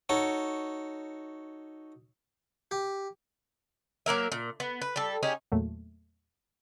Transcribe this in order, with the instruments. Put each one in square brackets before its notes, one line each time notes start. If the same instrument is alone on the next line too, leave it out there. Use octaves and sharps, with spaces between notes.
[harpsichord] D#4 F#4 A4 C#5
G4
[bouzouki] F#3 A#3 A#4 E5
A#2
B3
B4
G3 A4
C#4 D#4 G4 G#4
[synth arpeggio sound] E2 A#2 F#3 A3 A#3